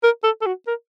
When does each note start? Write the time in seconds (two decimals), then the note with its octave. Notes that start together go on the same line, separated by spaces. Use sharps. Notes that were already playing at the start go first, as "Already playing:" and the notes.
0.03 A#4
0.24 A4
0.41 A4
0.46 F#4
0.67 A#4